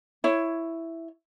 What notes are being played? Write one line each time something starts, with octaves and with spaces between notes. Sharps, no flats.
E4 C#5